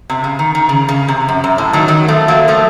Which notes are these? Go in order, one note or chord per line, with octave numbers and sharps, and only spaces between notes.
C3
C#3
D#3
D#3
C#3
C#3
C3
F#2
F#2
A2
D#3 F#3
D#3 F#3
F3 A3
F#3 A#3
F3 A3